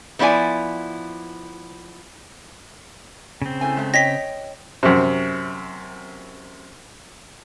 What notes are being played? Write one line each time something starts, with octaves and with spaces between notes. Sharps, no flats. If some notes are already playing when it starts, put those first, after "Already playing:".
F3 B3 E4 D5 G#5
C#3 C4
A2 A3 G#5
G#3 A3
C#5 D#5 G5 A#6 B6
F#2 C3